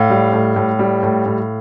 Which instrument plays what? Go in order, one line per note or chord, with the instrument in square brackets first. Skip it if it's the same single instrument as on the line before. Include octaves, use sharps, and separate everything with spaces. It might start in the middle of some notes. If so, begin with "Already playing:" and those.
Already playing: [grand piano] A2 F5
G3
A2
A2
G3
A2
A2